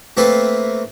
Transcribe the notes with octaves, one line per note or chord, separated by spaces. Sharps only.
A3 A#3 C4 A4 B4 F5